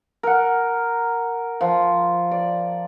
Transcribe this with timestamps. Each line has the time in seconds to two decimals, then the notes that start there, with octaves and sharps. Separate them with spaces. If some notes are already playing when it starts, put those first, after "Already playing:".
0.23 A#4 F#5
1.61 F3
2.31 D5